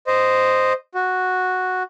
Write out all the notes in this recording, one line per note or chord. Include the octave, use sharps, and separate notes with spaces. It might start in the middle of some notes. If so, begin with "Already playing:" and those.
C5 D#5
F#4